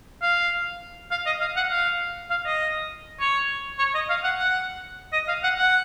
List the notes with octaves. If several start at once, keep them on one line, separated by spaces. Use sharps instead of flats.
F5
F5
D#5
F5
F#5
F5
F5
D#5
C#5
C#5
D#5
F5
F#5
F#5
D#5
F5
F#5
F#5